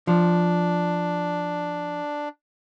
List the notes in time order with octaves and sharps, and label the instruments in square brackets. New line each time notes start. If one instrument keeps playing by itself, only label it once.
[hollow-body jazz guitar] F3 [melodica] D4